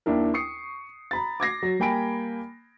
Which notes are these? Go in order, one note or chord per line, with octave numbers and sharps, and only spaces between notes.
D#2 D4 E4 A#4
C#6 D#6 C7 C#7
A#5 B5 A6
D6 G#6 A#6 C7
F#3
G3 A#3 G5 G#5 B5 D7